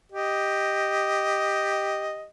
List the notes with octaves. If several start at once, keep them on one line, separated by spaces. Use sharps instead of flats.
G4 D#5